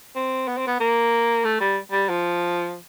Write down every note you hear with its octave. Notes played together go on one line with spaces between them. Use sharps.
C4
B3
C4
B3
A#3
A3
G3
G3
F3